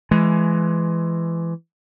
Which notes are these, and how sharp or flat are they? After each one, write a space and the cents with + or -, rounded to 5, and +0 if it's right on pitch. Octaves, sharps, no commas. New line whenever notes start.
E3 +20 G#3 +25